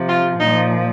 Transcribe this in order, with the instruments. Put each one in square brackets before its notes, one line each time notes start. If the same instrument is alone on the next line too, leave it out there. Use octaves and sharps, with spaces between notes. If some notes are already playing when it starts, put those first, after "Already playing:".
Already playing: [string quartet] C3 F3
F4
A#2 F3 D#4